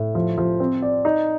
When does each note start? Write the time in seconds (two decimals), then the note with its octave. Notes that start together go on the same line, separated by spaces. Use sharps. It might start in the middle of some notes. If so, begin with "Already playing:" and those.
Already playing: A2
0.15 F3
0.38 F3
0.60 C4
0.82 D5
1.05 D#4